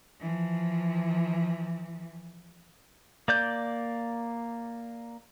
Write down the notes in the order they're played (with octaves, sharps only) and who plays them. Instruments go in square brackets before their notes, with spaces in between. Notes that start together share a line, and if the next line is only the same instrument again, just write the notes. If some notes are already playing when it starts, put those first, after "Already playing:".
[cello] E3 F3
[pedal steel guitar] A#3 D5 G6